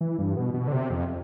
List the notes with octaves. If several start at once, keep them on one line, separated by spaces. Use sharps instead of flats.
E3
G2
B2
B2
D3
C3
F2